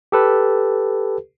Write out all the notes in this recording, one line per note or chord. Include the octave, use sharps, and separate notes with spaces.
G4 A4 B4